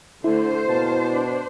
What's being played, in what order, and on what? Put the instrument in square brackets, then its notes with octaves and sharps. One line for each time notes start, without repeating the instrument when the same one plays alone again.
[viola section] D3 A3 [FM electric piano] E4 [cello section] C5
[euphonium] B2 [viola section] A#3 A5
[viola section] D4